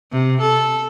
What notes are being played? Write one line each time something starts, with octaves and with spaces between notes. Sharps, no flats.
C3
A4